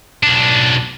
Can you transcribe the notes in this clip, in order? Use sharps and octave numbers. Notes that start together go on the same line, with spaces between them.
B1 D4